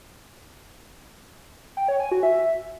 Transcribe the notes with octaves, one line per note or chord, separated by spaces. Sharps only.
G5
C#5
G#5
F#4
E5